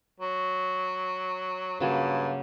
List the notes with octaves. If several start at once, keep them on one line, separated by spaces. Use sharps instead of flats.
F#3
G2 C#3 F#3 A#3